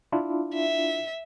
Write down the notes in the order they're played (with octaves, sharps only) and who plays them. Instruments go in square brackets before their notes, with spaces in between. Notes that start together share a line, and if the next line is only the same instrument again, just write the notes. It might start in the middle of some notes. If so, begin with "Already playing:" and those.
[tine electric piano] D4 E4 F4
[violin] E5